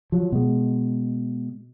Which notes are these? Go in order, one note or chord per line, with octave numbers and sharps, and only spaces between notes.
F3 F#3
B2 G#3